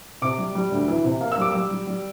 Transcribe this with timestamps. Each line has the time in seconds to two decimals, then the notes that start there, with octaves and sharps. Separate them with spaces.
0.22 C3 D6
0.38 G3
0.55 G3
0.71 D2
0.88 E3
1.04 C3
1.21 A#3
1.32 E6
1.38 G3 D6
1.52 G3 E6
1.71 G3
1.87 G3